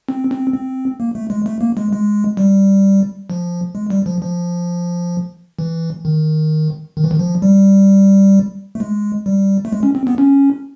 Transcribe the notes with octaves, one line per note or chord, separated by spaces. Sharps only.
C4
C4
C4
A#3
A3
G#3
A3
A#3
G#3
G#3
G3
F3
G#3
G3
F3
F3
E3
D#3
D#3
E3
D#3
F3
G3
A3
G#3
G3
A3
G#3
C#4
C4
B3
C#4